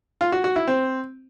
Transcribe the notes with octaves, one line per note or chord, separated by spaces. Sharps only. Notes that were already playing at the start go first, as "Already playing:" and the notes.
F4
F#4
F#4
E4
C4